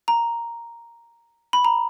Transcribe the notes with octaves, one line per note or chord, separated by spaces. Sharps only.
A#5
B5
A#5